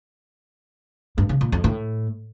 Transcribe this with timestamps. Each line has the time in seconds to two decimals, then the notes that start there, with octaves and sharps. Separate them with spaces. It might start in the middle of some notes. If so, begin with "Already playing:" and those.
1.18 G2
1.29 C#3
1.41 A#2
1.52 F2
1.64 A2